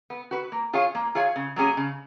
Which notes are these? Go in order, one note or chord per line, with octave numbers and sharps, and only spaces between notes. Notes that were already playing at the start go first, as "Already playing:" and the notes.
B3
F#4 B4
A#3
F4 G#4 C#5 F5
A#3
F4 G#4 C#5 F5
C#3
F#3 A#3 C#4 G#4
C#3